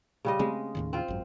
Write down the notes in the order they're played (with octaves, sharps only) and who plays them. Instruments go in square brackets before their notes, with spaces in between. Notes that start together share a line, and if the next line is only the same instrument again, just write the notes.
[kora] C#3 G3 D#5
[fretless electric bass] C#3 A3 C4 [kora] G#3
[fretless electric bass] D#2 A2 D#3
[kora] C4 F4
[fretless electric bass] G#1 F#2